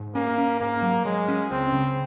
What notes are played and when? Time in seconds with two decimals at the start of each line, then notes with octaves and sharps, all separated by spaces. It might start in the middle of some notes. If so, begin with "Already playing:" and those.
Already playing: G#2
0.15 A#3 C#4
0.38 C#4
0.60 G#2 A#3
0.82 F#3
1.05 F#3 G#3
1.28 C#4
1.50 C#2 C4
1.73 C#3